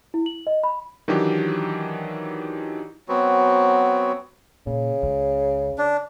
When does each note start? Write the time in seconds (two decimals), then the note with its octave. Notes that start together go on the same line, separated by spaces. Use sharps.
0.14 E4
0.26 F#7
0.47 D#5
0.64 B5
1.08 D#3 E3 F#3 D4 G4
3.08 F#3 B3 C4 F#4
4.67 A#2 C#3
5.03 C#2
5.78 D4